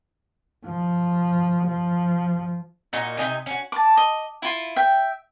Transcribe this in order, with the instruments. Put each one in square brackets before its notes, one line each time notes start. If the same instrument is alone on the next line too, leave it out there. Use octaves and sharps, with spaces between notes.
[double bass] F3
F3
[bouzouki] A#2 D#4 F#4
C3 B3 D#4 G#5
C#4 F#4
[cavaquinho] A5 D6
D#5
E4 F4
E5 G5